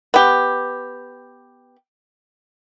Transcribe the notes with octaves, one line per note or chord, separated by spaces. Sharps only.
B3 G4